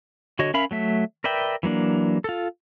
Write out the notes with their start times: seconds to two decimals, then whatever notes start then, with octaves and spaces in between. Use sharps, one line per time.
0.39 D3 F#4 C#5 D#5
0.54 C#4 A#4 E5 F5 B5
0.71 F#3 A3 E5
1.24 A#4 B4 D5 E5 G5
1.63 E3 F#3 A#3 D4
2.24 F4 A4